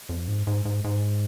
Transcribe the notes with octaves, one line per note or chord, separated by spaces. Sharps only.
F2
G#2
G#2
G#2
G#2